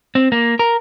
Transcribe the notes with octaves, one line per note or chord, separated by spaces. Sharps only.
C4
A#3
A#4